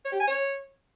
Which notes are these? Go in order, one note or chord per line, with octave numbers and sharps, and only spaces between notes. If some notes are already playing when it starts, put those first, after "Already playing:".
C#5
G4
G#5
C#5